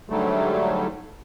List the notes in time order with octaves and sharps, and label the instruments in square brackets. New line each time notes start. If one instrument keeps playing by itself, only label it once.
[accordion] G#2 D3 F#3 G3 A3